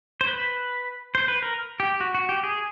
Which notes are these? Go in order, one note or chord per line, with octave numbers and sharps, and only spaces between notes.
C5
B4
C5
B4
A#4
G4
F#4
F#4
G4
G#4